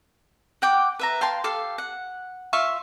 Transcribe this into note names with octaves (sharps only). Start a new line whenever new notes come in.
F#5 G5 D6
B4 E5 A#5
F5 G5 A5 C6
G4 A4 F5
F#5
F4 E5 F5 C#6